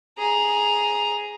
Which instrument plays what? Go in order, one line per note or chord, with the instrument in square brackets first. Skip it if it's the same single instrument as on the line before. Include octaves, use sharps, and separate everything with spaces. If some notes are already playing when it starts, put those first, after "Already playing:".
[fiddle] G#4 A#5